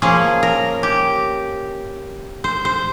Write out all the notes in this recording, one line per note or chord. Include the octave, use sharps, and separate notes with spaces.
F3 A#3 C#4 G#4
A#4
G4
C5
C5